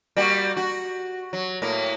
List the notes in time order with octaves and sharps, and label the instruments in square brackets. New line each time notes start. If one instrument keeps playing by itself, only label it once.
[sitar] G3 A#3 F#4
F#4
F#3
A2 A#3